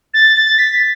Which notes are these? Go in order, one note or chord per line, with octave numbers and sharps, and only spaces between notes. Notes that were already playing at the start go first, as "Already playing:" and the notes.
A6
A6
B6